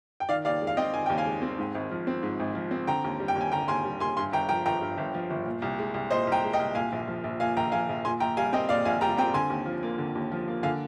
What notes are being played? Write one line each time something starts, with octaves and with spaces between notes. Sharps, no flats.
G5
D#3 D5 F5
D#2 D5 F5
G#3
F5
C4 D#5 G5
D#3 G#5
D#2 G5
F5 G#5
G#3
C4
G#2
G#1
F3
C4
G#2
G#1
F3
C4
D3 G5 A#5
D#2
G3
G5
D#2
G#5
D3 G5 A#5
D#2 G#5 C6
G3
D#2 G#5 C6
G2 G#5 C6
G1 G5 A#5
F3 G5 A#5
G1 G5 A#5
G2
G1
F3
G1
A#2
C2
G#3
C2
A#2 C5 D#5
C2 G5 A#5
G#3
D#5 G5
C2
A#2 F5 G#5
A#1
F3
A#1
A#2 F5 G#5
A#1 G5 A#5
F3 F5 G#5
A#1
A#2 G#5 C6
A#1 G5 A#5
G3 F5 G#5
C4 D#5 G5
A#2 D5 F5
A#1 F5 G#5
G3 G5 A#5
C4 G5 A#5
D3 G#5 C6
D#2
F3
A#3
D3
D#2
F3
A#3
D3 F5 G#5